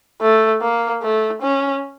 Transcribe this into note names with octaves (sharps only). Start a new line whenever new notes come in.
A3
A#3
A3
C#4